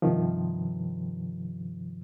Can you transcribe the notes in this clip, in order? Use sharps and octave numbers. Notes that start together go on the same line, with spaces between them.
G2 C3 D#3 F3